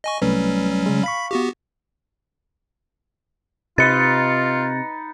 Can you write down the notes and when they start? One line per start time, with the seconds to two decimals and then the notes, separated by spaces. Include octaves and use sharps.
0.04 D#5 G#5 C#6
0.22 C2 F#3 G3 A3 C#4 B4
0.86 C#3 G#3
1.04 F5 B5 C#6 B6
1.31 B3 F#4 G4
3.78 C3 D#4 F4 B4 A6 C#7